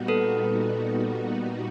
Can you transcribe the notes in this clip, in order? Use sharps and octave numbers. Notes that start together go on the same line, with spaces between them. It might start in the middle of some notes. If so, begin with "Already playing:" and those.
Already playing: A#2 G3 B3 D#4 F#4
A4 B4